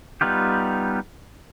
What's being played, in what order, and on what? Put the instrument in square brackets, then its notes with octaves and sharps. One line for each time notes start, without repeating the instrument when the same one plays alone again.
[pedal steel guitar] G3 B3 D#4 F4 G4